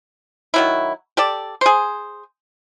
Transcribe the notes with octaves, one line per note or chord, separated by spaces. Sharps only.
D#3 F#3 E4
G4 A4 D5
G#4 C5